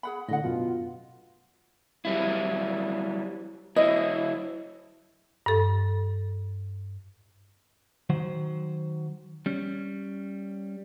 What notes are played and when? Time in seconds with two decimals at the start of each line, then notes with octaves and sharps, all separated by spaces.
0.03 G#4 F#5 B5
0.28 A2 D3 D#5 F#5
0.44 F#2 B2 F4
2.05 F#3 G3 E4
3.76 F#3 E4 D#5
5.46 G2 A4
8.10 D#3 F#3 C5 F#5
9.46 G3 C#4